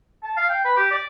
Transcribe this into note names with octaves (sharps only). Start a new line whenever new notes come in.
A5
F5
G5
B4
G4
D5